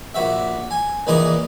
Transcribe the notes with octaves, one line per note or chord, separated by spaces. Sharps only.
A#1 F#4 E5
G#5
A#1 A#2 E3 G#4 D#5 A#5